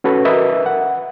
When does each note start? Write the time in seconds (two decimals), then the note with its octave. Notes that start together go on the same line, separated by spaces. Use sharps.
0.04 C#4 F#4 A4 B4
0.25 A#4 B4 D#5 E5
0.66 F#5